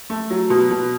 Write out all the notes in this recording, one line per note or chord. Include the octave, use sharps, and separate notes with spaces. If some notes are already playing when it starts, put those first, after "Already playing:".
A3
F#3
B2
B2